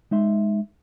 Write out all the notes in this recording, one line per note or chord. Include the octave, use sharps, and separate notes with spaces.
G#3 D#4 E5 C6